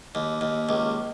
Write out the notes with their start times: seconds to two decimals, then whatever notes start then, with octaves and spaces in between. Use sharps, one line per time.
0.15 D#2
0.41 D#2
0.69 C#2